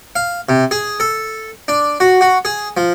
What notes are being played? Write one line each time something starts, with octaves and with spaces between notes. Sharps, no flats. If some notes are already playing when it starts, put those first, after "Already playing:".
F5
C3
G#4
A4
D4
F#4
F#4
G#4
F3